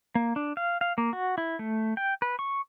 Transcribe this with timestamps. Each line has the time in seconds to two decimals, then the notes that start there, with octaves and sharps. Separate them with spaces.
0.15 A#3
0.36 D4
0.57 F5
0.81 F5
0.98 A#3
1.13 F#4
1.38 E4
1.59 A3
1.97 G5
2.22 B4
2.39 C#6